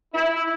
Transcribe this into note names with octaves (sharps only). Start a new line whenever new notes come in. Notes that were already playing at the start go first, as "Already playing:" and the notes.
E4